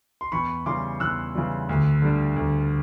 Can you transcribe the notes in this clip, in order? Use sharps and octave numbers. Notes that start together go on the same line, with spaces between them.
C6
E2 B5 C#6
C#3 E3 G3 C6 D6
E2 E6 F#6
C#3 E3 G3
D2
D3 G3
D2